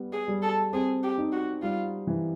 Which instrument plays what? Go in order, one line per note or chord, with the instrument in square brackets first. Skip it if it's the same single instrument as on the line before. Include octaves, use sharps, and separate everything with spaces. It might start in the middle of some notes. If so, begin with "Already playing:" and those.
Already playing: [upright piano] G3 B3
[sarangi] G#4
[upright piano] G3
[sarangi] A4
[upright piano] C4 [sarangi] G#4
[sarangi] G4
[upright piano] D#4
[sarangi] F#4
[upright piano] G3 [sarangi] F4
[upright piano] E3